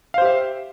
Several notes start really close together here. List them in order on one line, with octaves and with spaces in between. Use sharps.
F5 C5 G4 E5